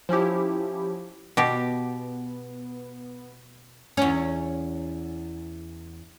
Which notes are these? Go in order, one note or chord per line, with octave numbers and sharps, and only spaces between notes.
F3 C#4 E4 G4
B2 B3 G4
E2 C#4